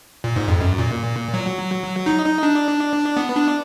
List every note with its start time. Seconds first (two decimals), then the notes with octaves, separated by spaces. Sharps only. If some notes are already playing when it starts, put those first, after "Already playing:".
0.24 A#2
0.36 G#2
0.48 F2
0.60 F#2
0.78 A#2
1.34 F#3
2.06 D#4
2.26 D#4
2.43 D4
3.17 B3
3.35 D4